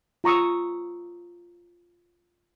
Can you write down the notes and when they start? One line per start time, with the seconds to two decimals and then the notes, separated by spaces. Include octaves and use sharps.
0.24 F4 A#5 C#6 D#6 E6